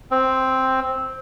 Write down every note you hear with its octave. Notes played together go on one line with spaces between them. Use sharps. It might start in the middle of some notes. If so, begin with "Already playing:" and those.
C4